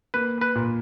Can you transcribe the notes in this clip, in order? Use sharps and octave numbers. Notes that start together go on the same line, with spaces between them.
A#3 B4
B4
A#2